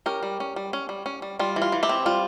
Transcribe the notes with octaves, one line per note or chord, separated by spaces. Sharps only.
C#4 G4 A#4
G3
C#4
G3
C#4
G3
C#4
G3
G3 F4
E3
F4
E3
E4 G4
C4
G3 F4